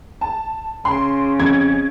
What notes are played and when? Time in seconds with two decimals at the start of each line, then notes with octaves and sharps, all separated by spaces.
0.21 A5
0.85 C#3 C6
1.40 F2 C#4 G#6